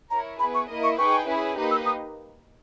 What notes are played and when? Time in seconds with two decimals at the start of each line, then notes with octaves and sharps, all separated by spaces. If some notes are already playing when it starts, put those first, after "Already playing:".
0.10 E4 A#4 C#5 A#5
0.40 B3 E4 G#4 B4 B5
0.55 C#6
0.69 A#3 E4 A#4 D#5
0.84 C#6
0.98 D#4 G#4 B4 G5 C#6
1.27 C#4 E4 G#4 B4
1.57 A#3 D#4 G4 B4 D#5
1.71 E6
1.86 D#6